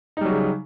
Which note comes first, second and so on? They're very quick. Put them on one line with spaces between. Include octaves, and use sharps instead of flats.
D#4 G3 F#3 C#3